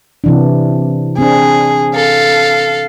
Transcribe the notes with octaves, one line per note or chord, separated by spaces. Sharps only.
C3 E3 D4
C4 D4 G#4
A4 F5